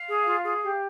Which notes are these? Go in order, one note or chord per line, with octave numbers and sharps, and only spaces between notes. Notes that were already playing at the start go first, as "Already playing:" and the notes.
Already playing: F5
G#4
F4
G#4
G4